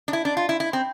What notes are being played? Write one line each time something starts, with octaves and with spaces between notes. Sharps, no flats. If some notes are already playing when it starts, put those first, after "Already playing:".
D4
E4
D4
F4
E4
E4
C4